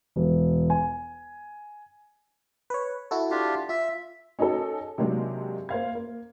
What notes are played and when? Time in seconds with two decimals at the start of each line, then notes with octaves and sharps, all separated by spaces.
0.16 E1
0.70 G#5
2.70 B4 C#5
3.11 E4 F#4 A4
3.31 D4 F4 G4
3.69 F4 E5
4.39 C#4 D#4 F#4 G#4 A4
4.98 C3 D#3 F#3 G#3 A#3 D4
5.69 A#3 C5 F5 G#6
5.95 A#3